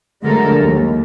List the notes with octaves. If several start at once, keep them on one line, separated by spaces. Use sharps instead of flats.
D3 F#3 G#3 A3 A4 A#4
D#2